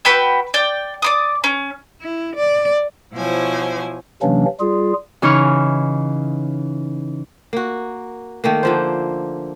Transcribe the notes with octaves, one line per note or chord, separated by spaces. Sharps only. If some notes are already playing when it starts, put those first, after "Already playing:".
F#4 B4 G5 E6
D5 G5
D5 D6 D#6
C#4
E4
D5
B2 F3 E4 C5 C#5 G#5
C3 E3 F#3 A#3 C#4 D4
G3 F4 G#4
C#3 E3 D#4 C#5 C#6 F6
A#3 F#4
D#3 A3 A#3
D3 F3 C5